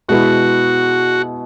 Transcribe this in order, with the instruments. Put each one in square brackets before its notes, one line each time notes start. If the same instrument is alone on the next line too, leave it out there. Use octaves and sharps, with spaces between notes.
[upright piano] B2 G#3 B3 E4 [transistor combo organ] F#4